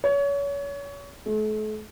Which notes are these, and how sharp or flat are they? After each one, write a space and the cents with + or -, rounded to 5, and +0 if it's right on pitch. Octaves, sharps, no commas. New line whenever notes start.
C#5 +30
A3 -40